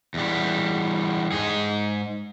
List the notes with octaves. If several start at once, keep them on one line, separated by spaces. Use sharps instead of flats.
E2 G3
G#2 G#4